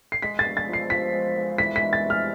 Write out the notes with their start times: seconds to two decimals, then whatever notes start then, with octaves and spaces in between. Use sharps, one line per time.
0.12 C7
0.22 G#3 B6
0.39 A6
0.45 B3
0.57 A6
0.68 F3
0.73 C7
0.90 F3 B6
1.13 G#3
1.36 B3
1.58 E3 B6
1.76 B6
1.82 G#3
1.93 A6
2.04 C3
2.10 F6